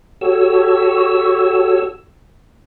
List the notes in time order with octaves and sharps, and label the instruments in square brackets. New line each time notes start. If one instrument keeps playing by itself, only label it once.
[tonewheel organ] F#4 G4 A4 C#5 E6